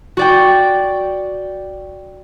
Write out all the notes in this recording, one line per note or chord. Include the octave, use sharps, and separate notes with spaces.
F#4 D5 G5